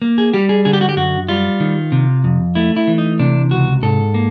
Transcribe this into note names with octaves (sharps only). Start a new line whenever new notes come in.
A#3
G#4
G3 G4
G#4
D3 G#4
G4
F#4
G4
F#2 F#4
G3 F4
D#3
C3
F2
A3 E4
E4
E3
D#4
C3 D4
C#2 F#4
G#2 A4
A#3